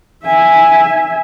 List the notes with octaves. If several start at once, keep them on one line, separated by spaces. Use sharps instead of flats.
E5 G#5